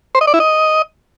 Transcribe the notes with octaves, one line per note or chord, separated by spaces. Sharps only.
C5
D#5
D5
E4
D#5